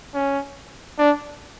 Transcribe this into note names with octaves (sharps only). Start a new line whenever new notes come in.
C#4
D4